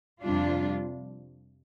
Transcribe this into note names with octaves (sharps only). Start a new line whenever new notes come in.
F2 C3 G3 D4 F4